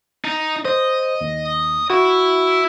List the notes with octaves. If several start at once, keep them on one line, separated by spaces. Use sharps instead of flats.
D#4
C5 D#5
D#2
E4 F#4